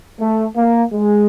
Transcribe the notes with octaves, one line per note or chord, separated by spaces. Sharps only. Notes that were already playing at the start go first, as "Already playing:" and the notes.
A3
A#3
G#3